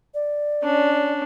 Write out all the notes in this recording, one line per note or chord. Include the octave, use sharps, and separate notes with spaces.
D5
C#4 D4